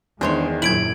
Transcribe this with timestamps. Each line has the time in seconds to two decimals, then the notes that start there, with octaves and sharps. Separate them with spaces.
0.21 E2 D#3 G#3 D4 C5 C#5
0.62 F#2 A#2 E4 G#6 D7 F#7